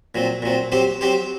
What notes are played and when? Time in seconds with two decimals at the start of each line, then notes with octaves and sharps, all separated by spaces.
0.15 A#2 F#3 C4
0.42 A#2 F#3 C4
0.72 F#3 C4 G4 C5
1.01 F#3 C4 G4 C5